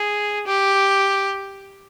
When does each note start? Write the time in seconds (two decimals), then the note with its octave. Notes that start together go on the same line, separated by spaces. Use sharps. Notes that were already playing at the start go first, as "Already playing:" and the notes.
Already playing: G#4
0.47 G4